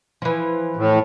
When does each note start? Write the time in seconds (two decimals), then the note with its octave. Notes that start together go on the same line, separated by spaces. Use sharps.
0.22 E3 F3
0.76 A2